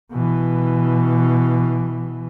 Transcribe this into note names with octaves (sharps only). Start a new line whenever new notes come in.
B2 E3